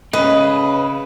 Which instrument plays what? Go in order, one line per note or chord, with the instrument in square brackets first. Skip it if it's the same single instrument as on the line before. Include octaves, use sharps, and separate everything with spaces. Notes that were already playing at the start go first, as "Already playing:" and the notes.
[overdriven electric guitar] C#3 C#4 [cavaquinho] B4 [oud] D#5